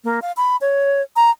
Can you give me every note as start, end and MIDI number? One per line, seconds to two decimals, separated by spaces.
0.04 0.20 58
0.22 0.32 77
0.37 0.57 83
0.61 1.02 73
1.16 1.31 82